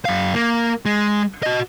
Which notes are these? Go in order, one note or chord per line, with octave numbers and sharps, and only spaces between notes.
F#2 F5
A#3
G#3
F#4 D#5